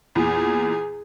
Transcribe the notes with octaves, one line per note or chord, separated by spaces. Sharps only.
E2 A#2 G#4